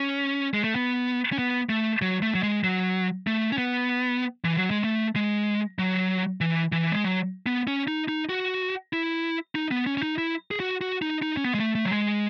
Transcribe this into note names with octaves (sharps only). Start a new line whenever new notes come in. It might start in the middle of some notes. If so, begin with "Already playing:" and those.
Already playing: C#4
G#3
A3
B3
C#4
B3
A3
F#3
A3
F#3
G#3
F#3
A3
C#4
B3
E3
F#3
G#3
A3
G#3
F#3
E3
E3
G#3
F#3
B3
C#4
D#4
D#4
F#4
E4
D#4
B3
C#4
C#4
D#4
E4
G#4
F#4
F#4
D#4
D#4
C#4
B3
G#3
A3
A3
F#3
G#3